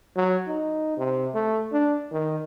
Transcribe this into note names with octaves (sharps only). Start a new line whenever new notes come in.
F#3
D#4
C3
A3
D4
D#3